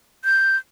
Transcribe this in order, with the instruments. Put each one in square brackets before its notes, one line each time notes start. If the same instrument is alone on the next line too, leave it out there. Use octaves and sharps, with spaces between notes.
[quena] G6